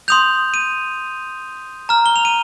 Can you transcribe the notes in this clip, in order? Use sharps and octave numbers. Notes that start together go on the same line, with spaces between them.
C6 D#6 G6 F7
D#7
A#5 F6
G7
F7
D#7